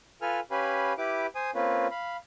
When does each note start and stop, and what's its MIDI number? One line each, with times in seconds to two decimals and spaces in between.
0.22 0.40 65
0.22 0.40 69
0.22 0.40 71
0.22 0.40 80
0.22 0.40 89
0.51 0.93 61
0.51 0.93 67
0.51 0.93 71
0.51 0.93 77
0.51 0.93 80
0.51 0.93 83
0.98 1.27 64
0.98 1.27 67
0.98 1.27 71
0.98 1.27 86
1.35 1.51 72
1.35 1.51 80
1.35 1.51 87
1.55 1.87 58
1.55 1.87 60
1.55 1.87 61
1.55 1.87 65
1.55 1.87 71
1.91 2.17 77
1.91 2.17 83